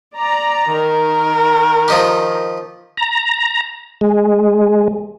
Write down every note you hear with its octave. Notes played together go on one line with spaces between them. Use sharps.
D5 A#5
D#3 A#4
F3 D#4 G4
A#5
G#3